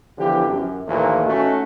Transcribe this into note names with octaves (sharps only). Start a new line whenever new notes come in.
D3 E3 F3 B3 G4
F#2
D#2 A#2 E3 F3 A3 A#3
A3 C#4 D#4 F#4